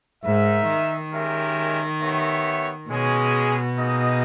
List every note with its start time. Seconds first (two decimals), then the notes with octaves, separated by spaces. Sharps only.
0.24 G#2 D#4 A#4 E5
0.69 D#3
1.12 G#3 C#4 G4 A#4 E5
2.01 B3 G4 C#5 E5
2.90 B2 G#3 C#4 G#4 C#5
3.78 A#3 D#4 G#4 D#5